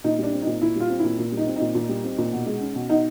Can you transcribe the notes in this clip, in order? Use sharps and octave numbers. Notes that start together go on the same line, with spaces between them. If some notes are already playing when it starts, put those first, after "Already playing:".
A#2 D#4
G3 D4
C4
A#2 D#4
A#2 E4
G3 F4
C4
A#2 E4
A#2
G3
D#4
C4
D#4
A#2
A#2
G3
C4
A#2
B2
G#3
C#4
B2
B2 D#4